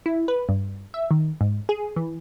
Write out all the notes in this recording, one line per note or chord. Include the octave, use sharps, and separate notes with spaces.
E4
B4
G2
E5
D#3
G#2
G#4
E3